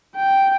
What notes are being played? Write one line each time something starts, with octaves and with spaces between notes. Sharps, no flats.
G5